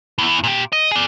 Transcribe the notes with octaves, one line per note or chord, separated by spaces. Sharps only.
E2 E3
A#2 G4
D#5
G#4 D5